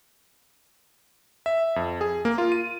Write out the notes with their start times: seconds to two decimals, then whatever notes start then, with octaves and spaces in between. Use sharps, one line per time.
1.46 E5
1.76 F2
2.01 G#4
2.25 A#3
2.38 F4
2.52 D#7